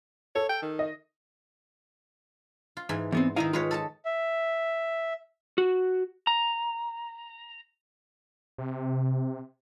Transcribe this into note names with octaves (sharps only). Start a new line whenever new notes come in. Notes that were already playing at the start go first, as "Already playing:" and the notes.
A4 C#5
G5
D#3
D#5
F4
G#2 E3 G#5
E2 B3 C4
D#3 D#4 E4 D#5 F5 A#5
G#3 F4 B4 C#5
A4 D#5 A5
E5
F#4
A#5
C3